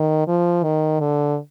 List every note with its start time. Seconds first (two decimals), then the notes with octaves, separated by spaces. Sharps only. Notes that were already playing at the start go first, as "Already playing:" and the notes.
Already playing: D#3
0.27 F3
0.63 D#3
1.00 D3